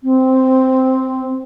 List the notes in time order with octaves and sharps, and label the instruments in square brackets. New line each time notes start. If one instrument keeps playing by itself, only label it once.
[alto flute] C4